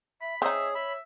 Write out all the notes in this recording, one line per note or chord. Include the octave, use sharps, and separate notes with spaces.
E5 B5
C4 D#4 G#4 C#5 E5
E5 B5